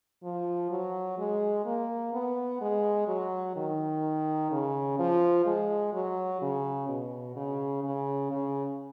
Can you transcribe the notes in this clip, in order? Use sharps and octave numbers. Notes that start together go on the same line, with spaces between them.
F3
F#3
G#3
A#3
B3
G#3
F#3
D#3
C#3
F3
G#3
F#3
C#3
B2
C#3
C#3
C#3